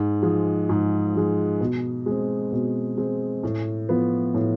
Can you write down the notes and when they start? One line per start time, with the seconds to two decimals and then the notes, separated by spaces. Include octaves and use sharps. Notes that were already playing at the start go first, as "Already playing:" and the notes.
Already playing: G#2
0.22 F3 G#3
0.69 G#2
1.14 F3 G#3
1.61 B2
2.06 G#3 C4
2.52 B2
2.97 G#3 C4
3.43 A2
3.89 F3 B3 F4
4.35 A2